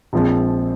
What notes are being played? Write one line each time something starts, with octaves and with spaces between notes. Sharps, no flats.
A#1 A#2 F3 G#3 C4